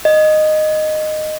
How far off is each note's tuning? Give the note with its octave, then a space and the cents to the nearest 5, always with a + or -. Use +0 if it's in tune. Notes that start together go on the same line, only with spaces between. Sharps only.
D#5 -10